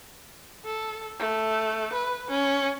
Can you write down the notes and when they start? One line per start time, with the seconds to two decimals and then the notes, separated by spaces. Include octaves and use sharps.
0.65 A4
1.19 A3
1.93 B4
2.30 C#4